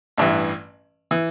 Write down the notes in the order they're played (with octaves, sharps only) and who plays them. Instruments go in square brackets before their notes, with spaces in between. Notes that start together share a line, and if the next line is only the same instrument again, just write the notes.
[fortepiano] A1 G2 E3
E3